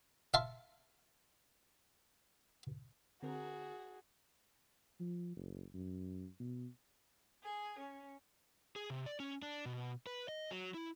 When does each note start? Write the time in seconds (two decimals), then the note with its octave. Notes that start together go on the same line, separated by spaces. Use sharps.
0.34 E5 F5 A5 C6
3.23 D3 C4 F#4 G#4 A#4
5.00 F3
5.36 F#1
5.74 F#2
6.40 B2
7.43 G#4
7.79 C#4
8.76 G#4
8.90 C3
9.06 D5
9.20 C#4
9.42 D4
9.66 B2
10.07 B4
10.29 D#5
10.51 F#3
10.74 E4